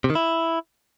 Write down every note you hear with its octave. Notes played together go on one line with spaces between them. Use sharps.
C3
D#3
E4